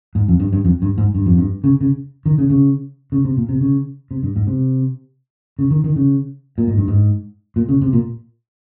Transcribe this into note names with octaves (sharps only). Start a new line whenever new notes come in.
G#2
F2
G2
G2
F2
G2
G#2
G2
F2
G2
C#3
C#3
D#3
C#3
C#3
C#3
C3
A#2
C3
C#3
C3
G2
G#2
C3
C#3
D#3
D#3
C#3
A#2
G#2
G2
G#2
A#2
C#3
C3
A#2